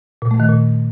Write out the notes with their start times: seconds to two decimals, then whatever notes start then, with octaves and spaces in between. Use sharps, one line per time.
0.22 A#2
0.31 A3
0.40 D#3
0.49 A#2